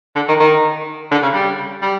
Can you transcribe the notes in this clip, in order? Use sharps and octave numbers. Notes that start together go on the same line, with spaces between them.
D3
D#3
D#3
D3
C#3
G3
G3